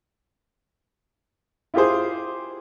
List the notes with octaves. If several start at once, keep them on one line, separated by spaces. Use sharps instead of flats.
E4 F4 G4 G#4 C5